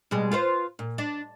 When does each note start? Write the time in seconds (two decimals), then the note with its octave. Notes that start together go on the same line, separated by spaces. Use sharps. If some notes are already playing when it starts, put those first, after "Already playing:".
0.11 B2 G3 G#3
0.32 F4 B4 C5
0.79 A#2
0.98 D4